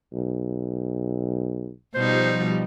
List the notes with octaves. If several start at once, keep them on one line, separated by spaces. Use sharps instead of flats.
B1
B2 F3 G3 D#4 C5